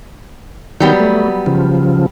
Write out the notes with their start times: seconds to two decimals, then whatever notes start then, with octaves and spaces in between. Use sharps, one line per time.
0.80 D#3 F#3 G3 B3 G6
1.00 A3
1.46 C#3 F3